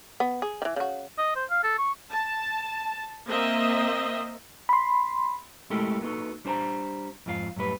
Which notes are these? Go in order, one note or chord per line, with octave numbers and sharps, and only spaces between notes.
B3
G#4
D#3 E3
C#3 F#4
D#5
C5
F5
A4
C#6
A5
A#3 C4 D#5 E5
B5 C6
G#3 A3 E4 G4 A4 A#4
A#3 B3 D#4 F#4 A4
G3 D4 C5 G#5 A#5
F2 G#2 F4 A4 F5
F#2 A2 G3 B4